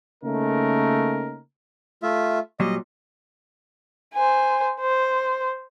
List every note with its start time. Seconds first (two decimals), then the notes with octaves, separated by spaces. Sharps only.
0.24 C#3 A3 A#3 C#4 D#4 A#4
2.03 A3 F4 E5
2.60 A#2 F#3 G3 D#5
4.14 C5 G#5
4.80 C5